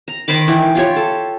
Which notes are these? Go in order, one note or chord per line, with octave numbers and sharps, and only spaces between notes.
A#5
D#3 C5 B5 D6
E3 G5
F4 G4 C#5
A4